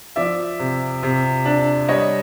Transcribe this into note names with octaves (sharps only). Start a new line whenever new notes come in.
F3 D5 E5
C3
C3
D4
G3 C#5 D#5